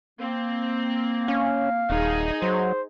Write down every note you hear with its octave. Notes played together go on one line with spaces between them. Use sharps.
A#3 C4
C#4 F5
D#1 D#4 G#4
F#3 C5